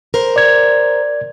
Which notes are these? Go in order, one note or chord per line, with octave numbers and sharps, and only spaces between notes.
A#4 C5
D5 G#6